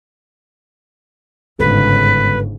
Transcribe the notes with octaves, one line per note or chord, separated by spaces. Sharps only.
G1 G#2 C#3 B4